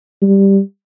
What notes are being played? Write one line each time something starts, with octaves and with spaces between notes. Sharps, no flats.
G3